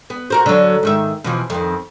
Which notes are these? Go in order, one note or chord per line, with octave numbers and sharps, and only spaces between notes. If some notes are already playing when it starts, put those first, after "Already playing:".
B3
F#4 A#4 C5
D3 F#3
G#2 D#3 E5
B2 E3 F3
F2 D#3